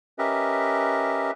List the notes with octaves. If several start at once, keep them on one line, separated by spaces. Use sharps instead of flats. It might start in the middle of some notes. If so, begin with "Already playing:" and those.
C#4 G4 A#4 B4 D#5 E5